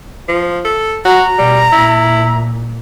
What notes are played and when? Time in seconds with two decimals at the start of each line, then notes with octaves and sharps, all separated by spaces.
0.29 F3
0.65 A4
1.05 F#4 A#5
1.38 B2 G3
1.72 A#2 E4